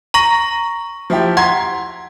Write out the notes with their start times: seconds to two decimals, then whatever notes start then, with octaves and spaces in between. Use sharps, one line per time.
0.14 A#5 C#6 A#6 F#7
1.10 F3 E4 G4
1.37 F#5 A#5 C6 G#6